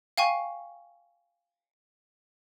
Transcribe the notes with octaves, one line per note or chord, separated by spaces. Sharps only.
F5 G5 G#5 C#6